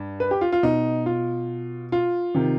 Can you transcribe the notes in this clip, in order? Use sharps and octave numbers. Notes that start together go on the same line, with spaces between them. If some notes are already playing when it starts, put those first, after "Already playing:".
Already playing: G2
B4
G4
F4
F4
B2 D#4
F4
F4
C3 D#3